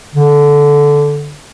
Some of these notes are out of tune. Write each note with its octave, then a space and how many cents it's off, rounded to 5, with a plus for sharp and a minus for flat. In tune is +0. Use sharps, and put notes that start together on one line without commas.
D3 -10